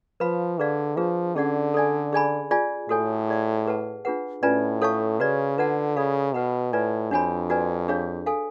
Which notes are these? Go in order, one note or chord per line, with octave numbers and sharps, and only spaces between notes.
F3 B4 F5 B5
D3 G#4 B4 D5 F5
F3 D4 F4 G#4 B4
D3 C#4 G#4 D5 F#5
A4 D5 G#5
G#4 D5 G#5 B5
F4 G#4 D5 G#5
A2 F#4 A4 C#5 G#5
G#4 D5 F5
G#4 B4 F#5 A5
D4 F4 G#4 B4 F#5
A2 C#4 F4 B4 D5 G#5
A4 C#5 F5 A5 C#6
C#3 F#4 B4 D5
D3 F4 B4 D5 F#5 A5
C#3 A4 D5 F5 B5
B2 B4 F#5 B5
A2 F4 B4 D5 G#5
F2 D4 F#4 C#5 G#5 B5
F#4 B4 D5 G#5
D4 G#4 C#5 F5
A4 F5 G#5